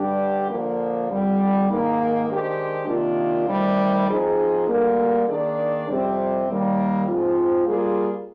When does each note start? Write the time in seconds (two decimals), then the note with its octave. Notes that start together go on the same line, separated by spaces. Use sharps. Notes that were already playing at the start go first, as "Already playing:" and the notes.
Already playing: G2 D3 G3 D4 G4
0.48 D3 F3 A#3
1.08 F2 D3 G3
1.68 G#2 D#3 A#3 D#4
2.28 D#3 G#3 D4 G4 C5
2.87 C3 D#3 A#3 D4 F4
3.48 D2 C3 D#3 G3
4.08 F3 C4 D#4 G#4
4.67 D2 D3 G3 A#3
5.27 D#3 A#3 D4 G#4 D5
5.87 F2 C3 G3 C4
6.47 D#2 D#3 G3 A#3
7.07 G#2 F3 C4 F4
7.67 G3 A#3 F4 G#4